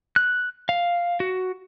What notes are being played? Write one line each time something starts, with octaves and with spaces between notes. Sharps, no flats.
F#6
F5
F#4